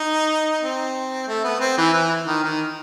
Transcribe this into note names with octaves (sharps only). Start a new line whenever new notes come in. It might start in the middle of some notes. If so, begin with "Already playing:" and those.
Already playing: D#4
C4
A3
B3
C4
E3
E3
D#3
D#3